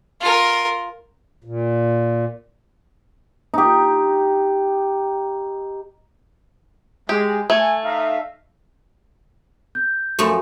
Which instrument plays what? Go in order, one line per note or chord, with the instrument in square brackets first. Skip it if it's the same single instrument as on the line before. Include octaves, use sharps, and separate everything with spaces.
[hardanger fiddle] F4 A#4
[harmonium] A#2
[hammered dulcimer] D#4 G4
[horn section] G#3 [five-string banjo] G4
[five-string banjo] A3 [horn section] G#5
[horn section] D#4 E5 F5
[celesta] G6
[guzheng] F#2 F3 A3 [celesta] F#4 G#5